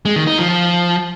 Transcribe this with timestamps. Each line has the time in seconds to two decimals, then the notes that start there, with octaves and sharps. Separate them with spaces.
0.05 G#3
0.16 D#3
0.27 D#4
0.38 F3
0.49 F3